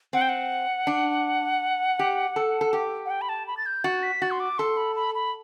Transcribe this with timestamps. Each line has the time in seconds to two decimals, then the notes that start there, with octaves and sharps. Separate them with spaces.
0.13 C4 F#5
0.21 G5
0.29 F#5
0.87 D4
1.99 G4
2.36 A4
2.61 A4
2.73 G4
3.06 F#5
3.10 G5
3.21 B5
3.29 A5
3.47 B5
3.57 A6
3.66 G6
3.84 F#4 A6
4.03 B6
4.22 F#4 A6
4.31 C6
4.40 D6
4.58 A4 C6
4.77 B5
4.96 B5
5.15 B5